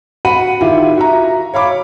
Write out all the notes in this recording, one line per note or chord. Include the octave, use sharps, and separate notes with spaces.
F#4 F#5 B5 D#7
D#3 E4 F4 G4
F#4 E5 A#5
C#5 F5 B5 D6